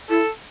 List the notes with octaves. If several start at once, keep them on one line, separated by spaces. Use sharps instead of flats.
E4 A4